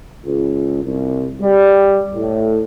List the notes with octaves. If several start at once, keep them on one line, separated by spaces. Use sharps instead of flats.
C#2
C2
G3
A2